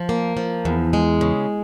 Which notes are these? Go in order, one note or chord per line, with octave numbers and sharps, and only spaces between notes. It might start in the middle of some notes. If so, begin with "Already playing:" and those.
Already playing: F3
A#3
F3
E2
G#3
C#3